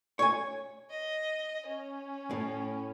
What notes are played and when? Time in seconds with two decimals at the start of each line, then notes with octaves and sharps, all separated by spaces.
0.19 C#5 G#5
0.90 D#5
1.66 C#4
2.31 A2